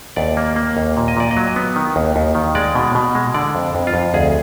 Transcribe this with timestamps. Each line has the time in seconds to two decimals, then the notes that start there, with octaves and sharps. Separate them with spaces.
0.16 D#2 D5
0.37 A#3
0.56 A#3
0.77 D#2
0.97 A#2
1.08 D#5
1.17 A#2 D5
1.31 D#5
1.37 F#3
1.56 B3
1.76 D#3
1.96 D#2
2.16 D#2
2.35 D#3
2.55 G#3 D5
2.75 B2
2.95 B2
3.15 G#3
3.34 D3 D5
3.55 F2
3.75 F2
3.87 F4
3.94 F2
4.14 D2 G#4